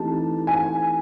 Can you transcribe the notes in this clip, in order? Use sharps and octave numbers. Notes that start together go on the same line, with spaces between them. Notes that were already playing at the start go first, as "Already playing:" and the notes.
Already playing: E3 A3 C4 D#4 G4 A5
G#5